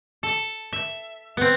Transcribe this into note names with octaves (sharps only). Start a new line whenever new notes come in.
A4
E5
B3 C4